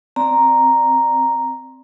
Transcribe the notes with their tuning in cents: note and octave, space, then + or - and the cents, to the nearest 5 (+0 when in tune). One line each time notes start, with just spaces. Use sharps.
C4 +0 D5 +0 A#5 +0